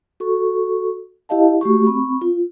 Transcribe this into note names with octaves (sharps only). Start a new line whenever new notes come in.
F#4 A4 C#6
E4 G4 D#5 F5 A5
A3 F#4 G4 C#6
C4 B5 C#6
F4